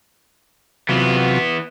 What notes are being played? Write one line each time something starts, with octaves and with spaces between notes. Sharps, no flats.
C3 E3 F#3 B3 F4